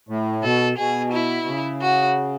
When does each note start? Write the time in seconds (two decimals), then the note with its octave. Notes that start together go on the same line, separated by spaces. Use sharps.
0.09 A2
0.43 B2 A4
0.77 B2 G#4
1.12 E4
1.47 C#3
1.82 F#4